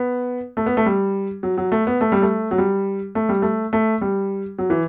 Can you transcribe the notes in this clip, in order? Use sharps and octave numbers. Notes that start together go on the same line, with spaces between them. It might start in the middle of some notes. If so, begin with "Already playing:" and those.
Already playing: B3
A3
B3
A3
G3
F#3
F#3
A3
B3
A3
G3
A3
F#3
G3
A3
G3
A3
A3
G3
F#3
E3